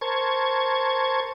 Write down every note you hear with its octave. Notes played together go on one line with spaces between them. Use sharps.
A#4 C5 A5 C#6 G#6